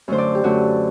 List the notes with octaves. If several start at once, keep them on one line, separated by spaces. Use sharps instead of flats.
F#2 D3 A3 C5
D5
G4
F#2 D3 A3 F#4